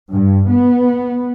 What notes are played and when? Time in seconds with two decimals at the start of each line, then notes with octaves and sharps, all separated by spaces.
0.11 G2
0.52 B3